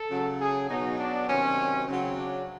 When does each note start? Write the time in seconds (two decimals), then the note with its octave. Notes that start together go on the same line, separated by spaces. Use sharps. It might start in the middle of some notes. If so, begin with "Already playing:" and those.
Already playing: A4
0.10 C#3 F#3
0.40 G#4
0.69 B2 F#3 D#4
0.98 D4
1.28 C3 D#3 F#3 C#4
1.87 C#3 F#3 C4
2.17 D4